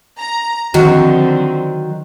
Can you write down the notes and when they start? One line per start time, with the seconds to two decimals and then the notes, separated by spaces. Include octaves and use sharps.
0.18 A#5
0.74 D3 D#3 F3 F#3 C4 F#4